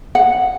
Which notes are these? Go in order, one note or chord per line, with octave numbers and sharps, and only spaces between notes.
F#5